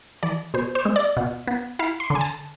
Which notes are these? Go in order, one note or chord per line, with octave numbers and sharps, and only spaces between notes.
E3 D5
B2 C5
C5
G#3
D5
B2
B3
E4 F5
C6
D3
G#5
A5